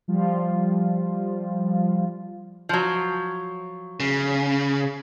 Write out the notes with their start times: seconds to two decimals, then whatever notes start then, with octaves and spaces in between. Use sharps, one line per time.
0.08 F3 G3 F4
2.69 F3 F#3
4.00 C#3